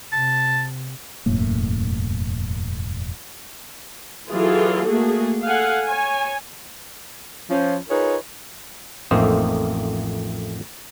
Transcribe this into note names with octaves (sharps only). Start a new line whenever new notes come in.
C3 A5
E1 F#2 A2 A#3
E3 F#3 F4 G#4 A4
A3 A#3 F#4 G#4
A4 F5 F#5 G#5
C#5 G#5
F3 C#4
D#4 F4 G#4 A#4 B4 C#5
A1 F2 A3 A#3 D#4 C5